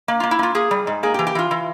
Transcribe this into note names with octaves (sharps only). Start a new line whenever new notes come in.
A#3
A#3 F4
E4
A#3 F4
A#3 G#4
G3
G#2
A#3 G#4
G4
E3
G4
E3 F4
E3